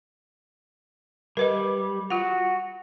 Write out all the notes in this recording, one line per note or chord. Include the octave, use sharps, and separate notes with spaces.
G3 A#4 B4 D#5
F4 F#4 F#5